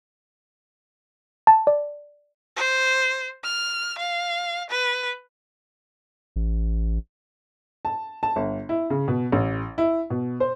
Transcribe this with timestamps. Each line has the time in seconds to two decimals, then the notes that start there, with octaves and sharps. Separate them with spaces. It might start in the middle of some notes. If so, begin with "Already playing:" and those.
1.47 A5
1.67 D5
2.56 C5
3.44 F6
3.98 F5
4.70 B4
6.36 A1
7.85 A5
8.23 A5
8.36 G1
8.69 E4
8.90 C#3
9.08 B2
9.32 A1
9.78 E4
10.10 B2
10.40 C5